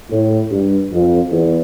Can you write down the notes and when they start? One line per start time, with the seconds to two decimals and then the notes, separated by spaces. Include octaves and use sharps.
0.11 A2
0.51 G2
0.92 F2
1.32 E2